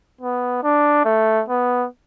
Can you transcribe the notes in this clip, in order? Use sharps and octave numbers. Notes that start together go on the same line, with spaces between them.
B3
D4
A3
B3